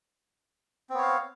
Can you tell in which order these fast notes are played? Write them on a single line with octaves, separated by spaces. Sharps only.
C4 B3 C#5 F5